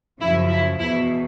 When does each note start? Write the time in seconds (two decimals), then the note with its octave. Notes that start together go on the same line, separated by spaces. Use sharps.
0.20 F#2 C#3 F3 E4
0.49 E4
0.78 E2 B2 E4